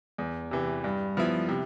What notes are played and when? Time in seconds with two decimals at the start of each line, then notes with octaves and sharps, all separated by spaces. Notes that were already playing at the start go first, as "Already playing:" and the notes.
0.18 E2
0.51 C3 E3
0.84 G2
1.17 F3 B3 E4
1.49 C3